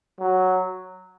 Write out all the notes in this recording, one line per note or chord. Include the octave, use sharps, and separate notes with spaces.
F#3